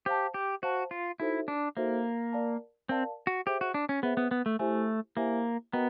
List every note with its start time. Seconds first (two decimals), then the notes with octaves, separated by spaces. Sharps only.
0.06 G4 C5 F5 A5
0.34 G4
0.63 F#4 C5 F5 A5
0.91 F4
1.19 D#4 E4 F#4 A4 C5 E5
1.48 D4
1.77 A#3 D#4 F#4 A4 C5 E5
2.33 A#4 D5 F5 A5
2.89 C4 A#4 D5 F5 A5
3.27 F#4
3.46 G4 G#4 C5 E5
3.61 F#4
3.74 D4
3.89 C#4
4.02 B3 G#4 C5 E5
4.17 B3
4.31 B3
4.46 A3
4.59 A3 E4 G4 C5 E5 G#5
5.16 A#3 E4 G4 C5 E5 G#5
5.73 B3 F#4 A#4 D#5 G5 A#5